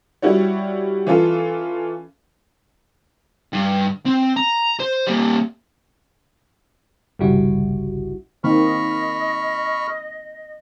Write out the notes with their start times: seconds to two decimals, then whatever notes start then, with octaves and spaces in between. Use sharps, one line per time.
0.22 G3 E4 F#4 C#5
1.07 E3 C#4 F4 A4
3.53 G2
4.06 C4
4.37 A#5
4.80 C5
5.08 G3 A#3
7.19 G1 C2 C#3 G3 E4 F#4
8.44 D#3 A#3 C4 D#5 B5 C#6 F6